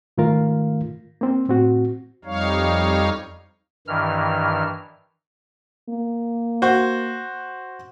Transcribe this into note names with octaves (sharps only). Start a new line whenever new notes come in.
G#2 D#3 A3 F4 A#4 F5
A#3 C4
A2 C4 F#4
F2 G3 D#4 C#5 F5
G2 D#3 E3 F6
A#3
F#4 C5